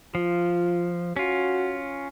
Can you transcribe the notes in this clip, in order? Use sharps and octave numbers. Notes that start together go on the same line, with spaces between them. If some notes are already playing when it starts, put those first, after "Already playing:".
F3 F4
C#4 F4 F#4